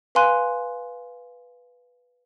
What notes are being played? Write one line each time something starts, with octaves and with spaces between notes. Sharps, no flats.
B4 F5 G#5 C6 F#6 D#7